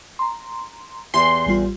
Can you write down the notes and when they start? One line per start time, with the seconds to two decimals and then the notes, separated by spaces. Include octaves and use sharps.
0.19 A#5 C6
1.14 E2 G4 E5 G#5 C6
1.47 A1 G3 F4